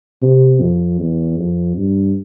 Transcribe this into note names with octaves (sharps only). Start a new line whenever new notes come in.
C3
F2
E2
F2
G2